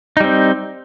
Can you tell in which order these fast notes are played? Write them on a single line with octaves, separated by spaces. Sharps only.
D#4 G3 C4